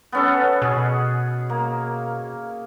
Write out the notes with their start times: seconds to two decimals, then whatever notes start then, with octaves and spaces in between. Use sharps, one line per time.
0.12 B3 C#4 A4
0.62 B2 G#4
1.50 A#3